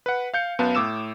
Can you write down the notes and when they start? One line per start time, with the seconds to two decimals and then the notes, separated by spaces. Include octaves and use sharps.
0.06 B4 F#5
0.34 F5 G6 C#7
0.59 F#2 B3 F5 A5
0.75 A2 D6 E6 E7